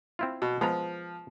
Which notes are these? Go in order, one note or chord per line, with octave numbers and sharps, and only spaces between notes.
C4 E4 F4
B2
F3 G#3 B3 A#5